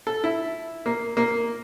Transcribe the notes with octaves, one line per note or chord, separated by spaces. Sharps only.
A4
E4
A#3
A#3